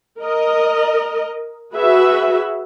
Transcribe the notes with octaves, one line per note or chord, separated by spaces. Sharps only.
A#4 D#5
F#4 G#4 B4 E5